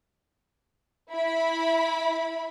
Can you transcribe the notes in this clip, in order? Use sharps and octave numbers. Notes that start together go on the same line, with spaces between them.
E4 B5